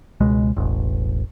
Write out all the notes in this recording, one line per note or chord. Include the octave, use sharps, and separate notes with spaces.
C#2 B2 G#3
E1 A1